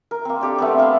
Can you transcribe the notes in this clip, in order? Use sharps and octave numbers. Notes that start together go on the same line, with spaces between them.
A#4
A#3 C4
D4 G4 A4
A3 B3 C4
E5 F5 B5 C6